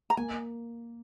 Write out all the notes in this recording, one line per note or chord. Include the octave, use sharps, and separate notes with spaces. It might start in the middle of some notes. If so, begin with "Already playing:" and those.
A#5
A#3 G#5